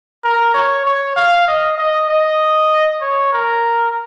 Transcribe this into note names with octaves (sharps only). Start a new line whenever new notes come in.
A#4
C#5
C#5
F5
D#5
D#5
D#5
C#5
A#4